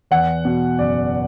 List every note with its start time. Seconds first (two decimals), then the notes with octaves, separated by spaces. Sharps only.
0.11 E2 F#5
0.45 B2
0.79 F#1 D5